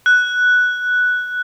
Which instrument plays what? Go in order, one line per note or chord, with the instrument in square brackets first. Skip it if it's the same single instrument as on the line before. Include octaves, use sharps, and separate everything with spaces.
[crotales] F#6